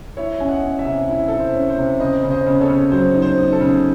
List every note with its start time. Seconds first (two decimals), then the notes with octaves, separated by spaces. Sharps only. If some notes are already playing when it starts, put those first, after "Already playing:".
0.17 E4 C#5 E5
0.40 C#4 G#5
0.48 D#5 F#5
0.63 C#4
0.79 E5 G#5
0.86 C3
1.09 E4
1.28 E4 A4
1.40 C5
1.55 C#4
1.70 C5
1.78 C3
2.00 C#3 C5 D#5
2.23 C#3
2.31 C5 D#5
2.46 C#3
2.61 A4 C#5
2.69 C#3
2.92 F#3 C5
3.14 D#4
3.22 C5
3.38 D#4
3.53 A4
3.61 C#3